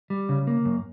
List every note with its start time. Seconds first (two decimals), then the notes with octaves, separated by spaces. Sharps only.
0.10 G3
0.29 C#3
0.47 A#3
0.65 F#2